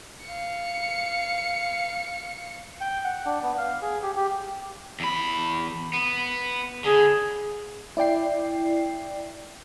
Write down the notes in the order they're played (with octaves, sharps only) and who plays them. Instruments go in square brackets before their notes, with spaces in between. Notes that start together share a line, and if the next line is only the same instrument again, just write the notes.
[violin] F5 C#7
[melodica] G5
F#5
D4
B3
F5
G#4
G4
G4
[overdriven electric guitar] E2 B5
B3
[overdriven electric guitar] D3 [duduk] G#4
[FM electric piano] E4 D5 G5 C7